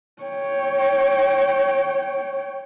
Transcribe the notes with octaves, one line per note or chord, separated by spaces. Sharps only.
C#5 G5